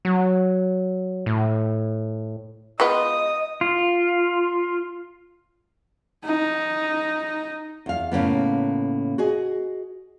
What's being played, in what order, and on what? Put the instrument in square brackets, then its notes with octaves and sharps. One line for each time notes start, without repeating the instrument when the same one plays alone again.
[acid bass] F#3
A2
[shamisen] G#3 B3 F4 [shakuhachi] D#5 [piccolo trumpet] D#6
[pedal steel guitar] F4
[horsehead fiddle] D#4
[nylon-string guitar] E2 F5
A2 C#3 A#3 B3
F#4 G#4 D#5